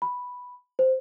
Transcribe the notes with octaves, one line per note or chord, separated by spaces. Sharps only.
B5
C5